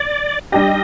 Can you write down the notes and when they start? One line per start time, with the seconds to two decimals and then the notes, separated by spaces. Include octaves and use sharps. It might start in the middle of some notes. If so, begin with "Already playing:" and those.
Already playing: D5
0.52 G3 D4 G4 D#5